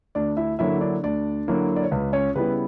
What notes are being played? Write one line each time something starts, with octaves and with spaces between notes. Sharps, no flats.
D2 D4 D5
E4 E5
D3 F#3 A#3 E4 E5
D4 D5
D2 D4 D5
D3 F#3 A#3 E4
D5
C#5
C#2 B4
C#4 C#5
C#3 G3 B3 E4 B4